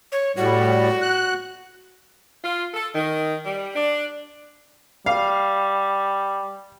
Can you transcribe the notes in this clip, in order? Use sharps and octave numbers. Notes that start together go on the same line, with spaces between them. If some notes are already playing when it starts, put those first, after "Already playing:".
C#5
A2 G3 F#4
F#6
F4
A4
D#3
G3
D4
G3 F5